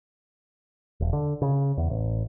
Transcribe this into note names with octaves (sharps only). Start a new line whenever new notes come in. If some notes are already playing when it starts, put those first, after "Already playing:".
E1
D3
C#3
E2
A1